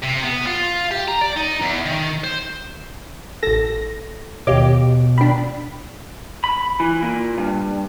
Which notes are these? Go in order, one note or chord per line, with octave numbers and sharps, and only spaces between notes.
C3
B3
F4
G4
A#5
D5
D#4
E2
D#3
C5
A1 A4 A#6
D#2 B2 G4 C#5 D#5 F5 D6
D#3 D4 G5 B5
B5
E3
A#2
G2